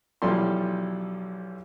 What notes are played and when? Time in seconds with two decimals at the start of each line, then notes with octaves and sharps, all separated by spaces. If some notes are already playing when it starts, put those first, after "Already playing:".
0.22 B1 E3 F3 G3 A4 C6